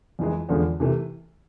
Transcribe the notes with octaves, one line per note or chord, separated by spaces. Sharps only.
F2 E3 G#3
E2 D3 F3 G#3
C3 E3 A3